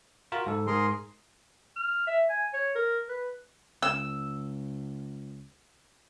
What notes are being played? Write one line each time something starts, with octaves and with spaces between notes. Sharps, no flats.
F4 F#4 A#4
G#2 A4
G#2 G#4 A#4 C6
F6
E5
G#5
C#5
A#4
B4
C#2 E6